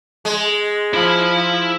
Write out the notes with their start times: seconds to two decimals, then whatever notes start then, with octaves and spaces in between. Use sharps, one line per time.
0.25 G#3
0.94 F3 E4 B5